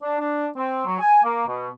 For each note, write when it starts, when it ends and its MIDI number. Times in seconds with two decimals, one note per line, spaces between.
0.02 0.17 62
0.19 0.46 62
0.56 0.84 60
0.86 0.97 54
1.00 1.19 80
1.23 1.45 58
1.47 1.69 47